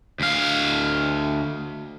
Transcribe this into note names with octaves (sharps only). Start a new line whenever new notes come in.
D2 F5